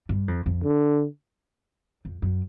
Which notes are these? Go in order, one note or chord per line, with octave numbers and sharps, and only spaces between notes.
G2
F2
F2
D3
F2
F#2